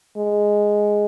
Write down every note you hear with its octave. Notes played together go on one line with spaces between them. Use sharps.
G#3